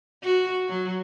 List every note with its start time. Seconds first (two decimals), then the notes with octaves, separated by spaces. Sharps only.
0.23 F#4
0.68 F#3